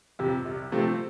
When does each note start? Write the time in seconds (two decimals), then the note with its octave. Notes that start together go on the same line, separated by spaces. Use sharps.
0.19 F2 C3
0.45 C2
0.72 C3 F3 A3 C4